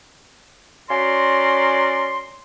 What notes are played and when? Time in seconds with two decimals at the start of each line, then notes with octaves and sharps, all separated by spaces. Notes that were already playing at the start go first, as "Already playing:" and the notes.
0.90 C#4 F#4 A#4 D5 C6